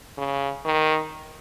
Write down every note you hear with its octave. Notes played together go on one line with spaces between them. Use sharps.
C#3
D#3